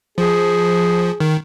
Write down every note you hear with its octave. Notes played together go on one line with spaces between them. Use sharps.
F3 G#4
D#3